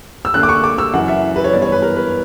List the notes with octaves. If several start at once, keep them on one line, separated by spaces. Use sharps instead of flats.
E6
D2 D3 A#3 D4 F#6
D6
C#6
D6
E6
F#1 F#2 E3 F#5
E5
B4
C#5
G2 E3 B3 D5
C#5
B4
A#4
B4